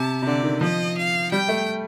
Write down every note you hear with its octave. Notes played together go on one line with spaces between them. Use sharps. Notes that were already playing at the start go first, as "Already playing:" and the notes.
Already playing: C3 A5
C3
D3 D5
D#3
F3 D#5
F5
G3 G5
A3